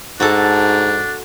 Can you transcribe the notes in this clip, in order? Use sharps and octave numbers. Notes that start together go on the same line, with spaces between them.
G#2 D4 F#4 A4